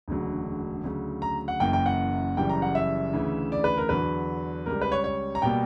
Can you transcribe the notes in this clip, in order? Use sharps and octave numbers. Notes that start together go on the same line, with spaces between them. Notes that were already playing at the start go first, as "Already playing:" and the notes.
E1 D2 C#3 F#3
D2 C#3 F#3
A#5
F#5
F#1 F#2 E3 A#3 G5
G5
F#5
F#1 F#2 E3 G3 G5
A#5
F#5
E5
D2 C#3 E3
D5
B4
A#4
E2 D3 F#3 B4
C#2 C#3 G3 A#4
B4
C#5
C#5
A#5
B2 G3 A#3 G5